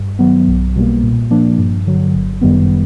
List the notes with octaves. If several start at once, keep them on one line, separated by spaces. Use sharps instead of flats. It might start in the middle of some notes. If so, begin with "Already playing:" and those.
Already playing: G2
D#3 F#3 B3
B1
B2 G3 A#3
A#2
F3 A#3 D4
G2
D3 F#3
G1
F#2 D#3 G3 B3